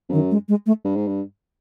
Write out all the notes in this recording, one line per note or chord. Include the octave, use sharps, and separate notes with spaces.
F2
F#2 D#3
G#3
G#3
A3
G2
G#2
G2